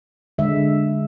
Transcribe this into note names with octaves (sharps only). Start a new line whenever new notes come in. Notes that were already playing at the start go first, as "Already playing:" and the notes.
D3 G#3 E5